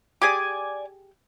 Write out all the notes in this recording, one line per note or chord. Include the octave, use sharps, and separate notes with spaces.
G4 G#4 D5 G#5 D6